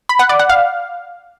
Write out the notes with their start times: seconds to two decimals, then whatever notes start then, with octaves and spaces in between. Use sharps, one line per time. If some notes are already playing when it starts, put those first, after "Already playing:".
0.09 B5
0.19 F#5
0.29 D5
0.39 F#5
0.50 F5